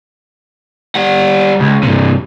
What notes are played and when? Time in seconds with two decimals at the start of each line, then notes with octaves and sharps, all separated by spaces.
0.95 G3 F#5
1.60 C#2
1.83 G2 C3